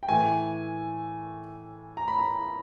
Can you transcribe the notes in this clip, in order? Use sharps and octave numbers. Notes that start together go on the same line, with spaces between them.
G5
A2 E3 A3 G#5
A#5
B5
A#5